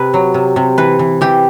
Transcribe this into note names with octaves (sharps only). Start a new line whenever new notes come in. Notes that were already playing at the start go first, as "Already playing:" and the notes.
Already playing: C3 B4
F#3
C3
C3
E3 B4
E3
E3 G4